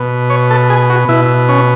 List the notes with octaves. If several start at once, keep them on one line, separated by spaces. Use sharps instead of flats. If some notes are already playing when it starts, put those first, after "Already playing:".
Already playing: B2
C#5
A4
G#4
F#4
B2 E4
C#4